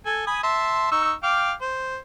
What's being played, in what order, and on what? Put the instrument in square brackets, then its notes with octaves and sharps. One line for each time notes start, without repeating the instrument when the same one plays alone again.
[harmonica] A4 G#5
G#5 B5 D#6
E5 A5 C6
D#4 C#6 E6
F5 G5 D6
C5